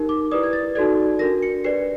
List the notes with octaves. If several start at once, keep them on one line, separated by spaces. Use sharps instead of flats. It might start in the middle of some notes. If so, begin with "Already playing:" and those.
Already playing: D#4 G4 A#4
D6
E4 G4 B4 D5 D#6
G#6
A6
D#4 F#4 A4 D5 G#6
D4 F#4 A#4 A#6
C#7
D4 G4 B4 D5 C7